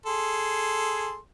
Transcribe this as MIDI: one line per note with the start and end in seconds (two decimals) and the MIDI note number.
0.06 1.16 68
0.06 1.16 69
0.06 1.16 84